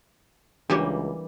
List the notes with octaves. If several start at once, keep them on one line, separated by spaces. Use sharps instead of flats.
C#2 E3 G3 A#3 D4 F#4 G4 C#5